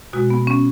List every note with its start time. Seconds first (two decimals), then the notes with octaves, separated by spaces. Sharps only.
0.13 B2 G#3 F#4
0.30 B3
0.47 C#4